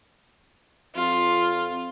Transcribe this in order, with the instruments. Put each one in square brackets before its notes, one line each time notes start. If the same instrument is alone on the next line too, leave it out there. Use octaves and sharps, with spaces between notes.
[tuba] F2 [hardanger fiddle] F4